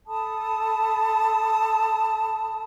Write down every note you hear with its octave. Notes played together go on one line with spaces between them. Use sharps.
A4 A5 B5 D#6